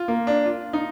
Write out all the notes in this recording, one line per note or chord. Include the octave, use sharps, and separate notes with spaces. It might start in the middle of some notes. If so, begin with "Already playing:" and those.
Already playing: F4
A#3
D4
F4
D#4